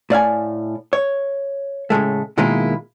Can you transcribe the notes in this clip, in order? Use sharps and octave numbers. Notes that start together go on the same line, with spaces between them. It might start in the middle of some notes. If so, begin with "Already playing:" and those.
A2 D5 F5 G#5
C#5
A2 C#3 G#3 A3
B2 D#3 G#3 A#3 E4 F4